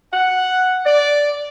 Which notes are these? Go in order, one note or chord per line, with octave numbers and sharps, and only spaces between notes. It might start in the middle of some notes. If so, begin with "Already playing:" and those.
F#5
D5